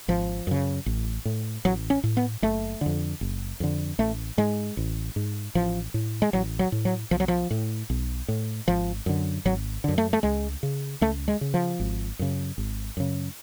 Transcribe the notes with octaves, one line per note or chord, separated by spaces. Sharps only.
G#1 F3
F#2 C#3
A1
A2
A1 F#3
C#4
A2
B3
F#1 A3
F2 D3
F#1
F2 D3
A1 A3
G#2 G#3
A1
G#2
A1 F3
A2
G#3
A1 F#3
F#3
A2
F#3
B1 F3
F#3
F3
A2
B1
A2
G#1 F3
F#2 D3
G#1 F#3
F#2 D3
A3
A3
C#2 G#3
C#3
C#2 A3
G#3
C#3
F3
G#1
F#2 C#3
G#1
F#2 C#3